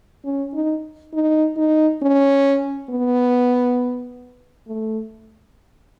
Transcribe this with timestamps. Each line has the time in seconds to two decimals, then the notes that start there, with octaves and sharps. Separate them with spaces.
0.25 C#4
0.54 D#4
1.14 D#4
1.57 D#4
2.02 C#4
2.90 B3
4.67 A3